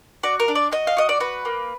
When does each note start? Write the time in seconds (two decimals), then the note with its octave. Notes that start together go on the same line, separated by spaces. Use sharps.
0.23 F#4 D5
0.40 A#4
0.48 D4
0.55 D5
0.72 F#4 D#5
0.87 F5
0.97 F#4 D#5
1.09 D5
1.20 F#4 B4
1.45 A#3